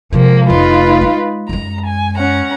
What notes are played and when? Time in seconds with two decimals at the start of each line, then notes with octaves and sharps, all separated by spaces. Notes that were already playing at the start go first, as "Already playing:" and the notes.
0.13 C3 F3 G#3 A#3
0.49 F1 A3 D#4 F4 B4
1.01 G#3
1.49 F#2 G#3 A#5
1.87 G#5
2.18 C#4 F#5 A#5